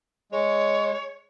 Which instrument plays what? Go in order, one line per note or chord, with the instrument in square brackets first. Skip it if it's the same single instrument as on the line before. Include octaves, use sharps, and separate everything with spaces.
[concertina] G#3 [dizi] C#5